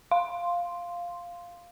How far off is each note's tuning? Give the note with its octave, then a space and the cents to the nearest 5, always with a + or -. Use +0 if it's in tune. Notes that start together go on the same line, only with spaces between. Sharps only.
F5 +0 C6 +0